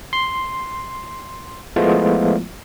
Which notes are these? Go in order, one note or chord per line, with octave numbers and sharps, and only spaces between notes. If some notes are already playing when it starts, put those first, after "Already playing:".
C6
F3 G#3 A3 B3 E4 F4